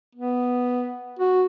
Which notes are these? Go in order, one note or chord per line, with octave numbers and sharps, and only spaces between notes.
B3
F#4